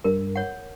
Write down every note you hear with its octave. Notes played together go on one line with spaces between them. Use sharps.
G2 A#4
C#5 F#5